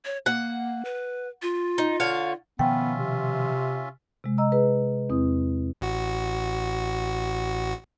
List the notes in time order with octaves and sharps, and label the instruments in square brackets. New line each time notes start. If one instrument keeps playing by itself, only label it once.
[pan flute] C#5
[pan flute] A#3 [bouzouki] F#5
[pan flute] B4
F4
[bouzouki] D#4
D3 C#5 F5
[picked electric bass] B2 D#3 F3 [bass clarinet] B3 [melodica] C#4 F4 E5 [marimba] G5
[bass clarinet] C3
[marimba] C3 G#3
D#5 A#5 E6
G#4 B4 D#5
E2 C4 E4 D#6
[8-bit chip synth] A1 F#4